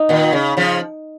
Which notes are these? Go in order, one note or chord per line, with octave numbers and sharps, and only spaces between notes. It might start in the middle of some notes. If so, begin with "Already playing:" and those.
Already playing: D#4
A#2 D#3
C#3
C#3 F3